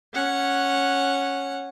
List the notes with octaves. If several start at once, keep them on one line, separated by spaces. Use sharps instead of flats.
C#4 F#5